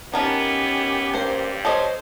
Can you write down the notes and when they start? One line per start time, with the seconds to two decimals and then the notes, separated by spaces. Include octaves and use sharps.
0.14 D#3 B3 C#4 G4 A#4 A5
1.14 G2 A#3 C5
1.65 A4 C5 C#5 D#5